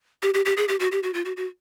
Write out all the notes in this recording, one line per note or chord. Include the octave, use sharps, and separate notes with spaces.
G4
G4
G4
G#4
G4
F#4
G4
F#4
F4
F#4
F#4